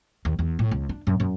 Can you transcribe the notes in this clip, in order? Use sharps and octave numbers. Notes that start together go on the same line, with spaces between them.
D#2
E2
A2
C#2
D4
F#2
F#2